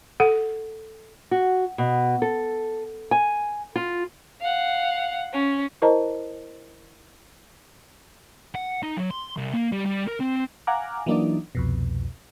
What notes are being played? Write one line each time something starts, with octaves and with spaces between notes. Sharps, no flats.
A4 F#5
F#4
B2
A4
G#5
F4
F5 F#5
C#4
E4 A#4 C5 D#5 A5 A#5
F#5
D#4
F#3
C6
C2
A#3
G3
G3
A#4
C4
F5 F#5 G#5 A#5 D6 F6
E3 F#3 A#3 D4 D#4 D5
C2 F2 B2